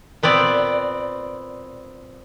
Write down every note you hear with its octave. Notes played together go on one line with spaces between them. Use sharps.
A#2 B3 C4 D5